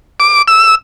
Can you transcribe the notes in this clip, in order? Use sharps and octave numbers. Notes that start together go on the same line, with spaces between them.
D6
E6